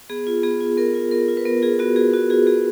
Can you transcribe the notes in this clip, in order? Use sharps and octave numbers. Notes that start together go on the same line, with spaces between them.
B3 G#4
F4
B3 G#4
F4
B3 A#4
F4
B3 A#4
F4
B4
B3 A#4
F4 G#4
B3 F#4
F4 G#4
B3 F#4
F4 G#4
B3 G#4